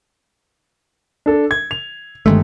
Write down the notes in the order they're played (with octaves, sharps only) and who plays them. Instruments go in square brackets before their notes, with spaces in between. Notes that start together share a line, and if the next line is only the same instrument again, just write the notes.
[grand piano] D4 A4
G#6
F7
[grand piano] G1 [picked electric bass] D#3 G#3 A3